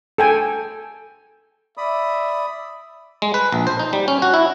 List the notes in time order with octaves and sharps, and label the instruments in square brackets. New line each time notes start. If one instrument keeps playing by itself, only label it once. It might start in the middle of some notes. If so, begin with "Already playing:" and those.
[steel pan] A4 G5 G#5
[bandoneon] D5 B5 D#6 [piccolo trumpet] E5
[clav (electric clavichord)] G#3
B4
A#1
C5
D#4
G3
C#4
F#4
E4